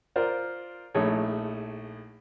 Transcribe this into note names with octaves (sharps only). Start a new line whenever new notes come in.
F4 A#4 C5 D5
A#1 A3 D#4 E4 G#4 C#5